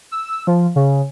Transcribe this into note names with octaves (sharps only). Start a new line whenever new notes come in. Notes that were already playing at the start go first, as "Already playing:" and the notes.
E6
F3
C#3